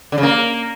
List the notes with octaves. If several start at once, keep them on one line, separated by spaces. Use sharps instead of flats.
D3
C#3
A#3